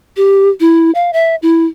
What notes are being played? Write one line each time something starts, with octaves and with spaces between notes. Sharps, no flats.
G4
E4
F5
E5
E4